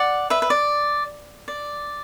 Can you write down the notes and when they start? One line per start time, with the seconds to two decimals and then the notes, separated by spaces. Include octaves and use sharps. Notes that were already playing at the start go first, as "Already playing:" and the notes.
Already playing: D5 F#5
0.30 B4 E5
0.42 B4
0.50 D5
1.48 D5